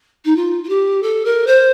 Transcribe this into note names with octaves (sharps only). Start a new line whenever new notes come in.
D#4
F4
F4
G4
A4
A#4
C5